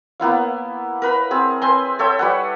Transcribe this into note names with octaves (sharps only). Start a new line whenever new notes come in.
A#3 B3 E4 F5
A#4 B4 B5
C4 G#4
C4 B4 G#5 C6
A4 C#5 E5 G5
G3 B4 F#5